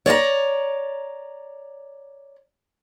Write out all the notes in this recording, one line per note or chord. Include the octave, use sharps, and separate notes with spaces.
C#5 D5 F#5 A#5